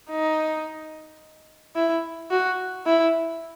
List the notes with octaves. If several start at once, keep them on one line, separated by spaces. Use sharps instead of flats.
D#4
E4
F#4
E4